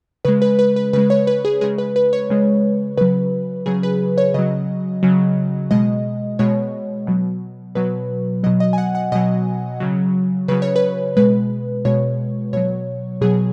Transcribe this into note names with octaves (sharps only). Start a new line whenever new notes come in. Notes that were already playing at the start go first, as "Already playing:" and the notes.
C#3 G#3 B4
B4
B4
B4
C#3 G#3 B4
C#5
B4
G#4
C#3 G#3 G#4
B4
B4
C#5
C#3 G#3
C#3 F#3 B4
C#3 F#3 G#4
B4
C#5
C#3 F#3 D#5
C#3 F#3
B2 G#3 D#5
B2 G#3 C#5
B2 F#3
B2 F#3 B4
B2 F#3 D#5
D#5
G#5
F#5
F#5
B2 F#3 D#5
C#3 F#3
C#3 F#3 B4
C#5
B4
B2 G#3 B4
B2 G#3 C#5
B2 F#3 C#5
B2 F#3 G#4